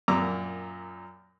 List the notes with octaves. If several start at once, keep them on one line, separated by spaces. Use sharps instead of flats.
F#2 A#2 A#5 D6 E6